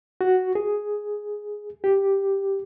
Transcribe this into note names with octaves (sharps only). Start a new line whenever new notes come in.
F#4
G#4
G4